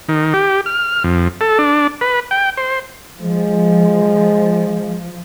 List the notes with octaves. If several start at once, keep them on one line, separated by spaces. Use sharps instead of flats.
D#3
G4
F6
F2
A4
D4
B4
G5
C5
F3 G#3